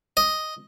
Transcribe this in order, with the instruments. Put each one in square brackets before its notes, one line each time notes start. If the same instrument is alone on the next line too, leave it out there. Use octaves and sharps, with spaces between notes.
[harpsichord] D#5